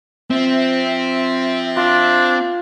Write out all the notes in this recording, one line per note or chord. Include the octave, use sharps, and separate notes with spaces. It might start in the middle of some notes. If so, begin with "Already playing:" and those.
F3 C4 E5
D4 F4